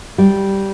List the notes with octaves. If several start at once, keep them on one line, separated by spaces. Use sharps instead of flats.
G3